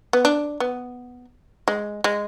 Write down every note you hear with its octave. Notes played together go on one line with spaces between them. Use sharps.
B3
D4
B3
G#3
G#3